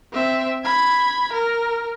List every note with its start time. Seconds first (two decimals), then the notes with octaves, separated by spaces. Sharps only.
0.12 C4 E5
0.64 B5 G#6
1.33 A#4